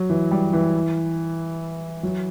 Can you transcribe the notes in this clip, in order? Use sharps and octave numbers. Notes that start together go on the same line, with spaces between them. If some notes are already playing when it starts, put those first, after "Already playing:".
Already playing: F#3
E3
G3
E3
F#3